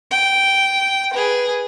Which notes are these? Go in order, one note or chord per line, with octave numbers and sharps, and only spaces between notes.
G5
G#4 B4